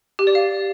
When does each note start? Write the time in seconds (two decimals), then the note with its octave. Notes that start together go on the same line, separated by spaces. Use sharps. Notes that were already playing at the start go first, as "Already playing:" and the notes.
0.19 G4
0.27 D5
0.35 F5